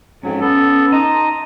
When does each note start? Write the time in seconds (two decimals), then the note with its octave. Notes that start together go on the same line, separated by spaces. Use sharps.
0.23 F2 G#2 F#3 C#4
0.40 B3 A4
0.92 D#4 D#5 A5 A#5 C6